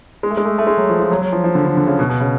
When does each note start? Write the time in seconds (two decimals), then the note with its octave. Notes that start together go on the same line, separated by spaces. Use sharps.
0.23 G#3
0.30 A3
0.37 G#3
0.45 A3
0.58 A3
0.67 G#3
0.77 F#3
0.89 F3
1.00 F3
1.11 F#3
1.22 F#3
1.32 F3
1.44 F3
1.55 D3
1.66 D3
1.77 D3
1.87 C#3
1.99 B2
2.10 B2
2.20 C#3